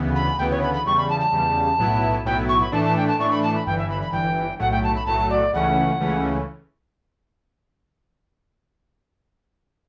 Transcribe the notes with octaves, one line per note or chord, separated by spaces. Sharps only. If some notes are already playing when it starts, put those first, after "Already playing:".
Already playing: D2 C#3 E3 B3
B5
D2 C#3 E3 B3 G5
C#5
B5
B5
E2 C#3 G3 C#6
B5
A5
A5
E2 C#3 G3
B1 A2 F#3 B3 E4
B1 A2 F#3 B3 E4 G5
C#6
B5
A2 E3 A3 D4 A5
A5
G5
A5
A2 E3 A3 D4 C#6
B5
A5
B5
G1 G2 E3 G5
E5
B5
B5
G1 G2 E3 G5
B1 A2 F#3 A3 F#5
G5
A5
B5
B1 A2 F#3 A3 A5
D5
C#2 C#3 E3 A3 C#4 F#5
C#2 C#3 E3 A3 C#4